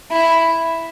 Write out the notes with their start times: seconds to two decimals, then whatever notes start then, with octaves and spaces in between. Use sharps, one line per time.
0.12 E4